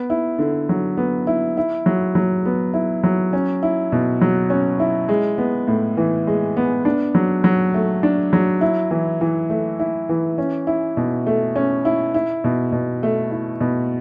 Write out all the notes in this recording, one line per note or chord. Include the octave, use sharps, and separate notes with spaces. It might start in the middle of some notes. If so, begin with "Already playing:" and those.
Already playing: B3
E4
D3
F#3
B3
E4
E4
F#3
F#3
B3
E4
F#3
C#4
E4
B2
F#3
C#4
E4
G#3
B3
A2
E3
G#3
B3
D4
F#3
F#3
A3
D4
F#3
E4
E3
E3
A3
E4
E3
C#4
E4
B2
A3
C#4
E4
E4
B2
B2
A3
E4
B2